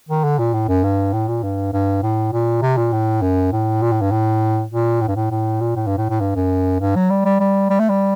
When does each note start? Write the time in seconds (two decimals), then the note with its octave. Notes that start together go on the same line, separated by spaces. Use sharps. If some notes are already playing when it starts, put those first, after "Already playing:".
0.09 D#3
0.24 D3
0.39 A#2
0.54 A2
0.68 F#2
0.84 G2
1.13 A2
1.28 A#2
1.43 G2
1.73 G2
2.03 A2
2.32 A#2
2.62 C3
2.77 A#2
2.92 A2
3.21 F#2
3.52 A2
3.82 A#2
3.92 A2
4.01 G2
4.11 A2
4.72 A#2
5.01 A2
5.08 G2
5.15 A2
5.31 A2
5.61 A#2
5.76 A2
5.87 G2
5.98 A2
6.10 A2
6.21 G2
6.36 F#2
6.80 G2
6.95 F#3
7.10 G3
7.25 G3
7.40 G3
7.70 G3
7.80 A3
7.89 G3